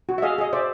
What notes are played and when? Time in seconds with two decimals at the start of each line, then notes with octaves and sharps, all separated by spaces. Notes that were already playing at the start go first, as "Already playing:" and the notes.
0.09 F#4
0.18 E5
0.22 G#4 D#5 F5
0.38 G#4 D#5
0.53 C5 D5 E5